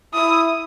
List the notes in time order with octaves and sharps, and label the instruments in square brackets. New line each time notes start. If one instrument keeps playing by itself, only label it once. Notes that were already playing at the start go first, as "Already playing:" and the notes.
[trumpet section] E4 [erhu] D#6